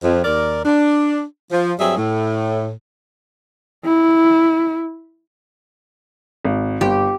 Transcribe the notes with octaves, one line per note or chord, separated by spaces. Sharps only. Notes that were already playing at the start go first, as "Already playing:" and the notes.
F2
D#2 A#4 D5
D4
F3
G2 F#3 G3 C4 G#4 E5
A2
E4
G#1
G1 G4